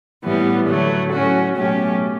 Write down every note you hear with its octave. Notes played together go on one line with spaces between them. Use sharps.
A2 E3 G3 B3
D3 F#3 A3
A2 F#3 C#4 F#4
B2 F#3 A3 C#4 G4